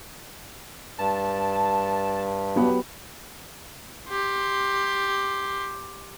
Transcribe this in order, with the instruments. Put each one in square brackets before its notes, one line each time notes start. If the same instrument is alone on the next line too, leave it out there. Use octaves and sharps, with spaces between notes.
[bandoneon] G2 [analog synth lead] A5
[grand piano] F#3 B3 G4
[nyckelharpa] G4 C6